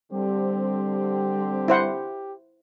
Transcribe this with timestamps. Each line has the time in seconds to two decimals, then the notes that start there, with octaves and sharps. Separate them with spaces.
0.13 D3 G3 C4 G4
1.68 E4 C5 F#5